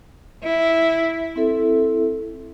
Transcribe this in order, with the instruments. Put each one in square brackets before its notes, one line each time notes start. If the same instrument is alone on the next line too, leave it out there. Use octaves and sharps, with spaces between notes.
[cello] E4
[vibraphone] C4 E4 A4 E5